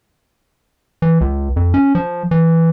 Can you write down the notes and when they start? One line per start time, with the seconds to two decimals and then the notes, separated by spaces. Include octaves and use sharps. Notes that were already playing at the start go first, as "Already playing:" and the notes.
1.02 E3
1.21 C#2
1.56 F2
1.74 C#4
1.95 F3
2.31 E3